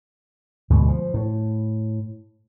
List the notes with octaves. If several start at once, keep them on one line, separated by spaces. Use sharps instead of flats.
D2 G#2 B2
F3
A2